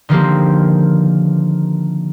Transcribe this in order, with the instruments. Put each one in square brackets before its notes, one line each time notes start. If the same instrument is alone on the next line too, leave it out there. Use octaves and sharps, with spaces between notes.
[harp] D3 D#3 F3 A#3 C4 G4